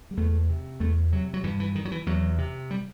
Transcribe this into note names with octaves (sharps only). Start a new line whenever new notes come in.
G3
E2 A3
C3
E2 A3
C3 F#3
F#3
G2 E3
E3
D#3
F#3
E3
E2 F#3
C3
G3